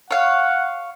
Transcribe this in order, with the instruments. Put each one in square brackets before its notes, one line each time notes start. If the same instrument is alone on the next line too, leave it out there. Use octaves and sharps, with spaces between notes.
[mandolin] C#5 F5 [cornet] F#5